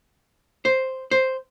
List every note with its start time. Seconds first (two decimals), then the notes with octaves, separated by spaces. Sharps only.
0.65 C5
1.11 C5